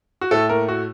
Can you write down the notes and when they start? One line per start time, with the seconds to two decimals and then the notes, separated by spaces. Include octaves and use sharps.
0.21 F#4
0.31 A2 A3 A4
0.49 A#3 A#4
0.69 F#4